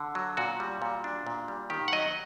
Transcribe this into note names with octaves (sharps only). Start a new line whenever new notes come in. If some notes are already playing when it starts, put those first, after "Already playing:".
Already playing: D3
F#3
A#2 F#4
G3
A#2
D4
A#2
G3
D#3 G4
F#5
F#3 D#5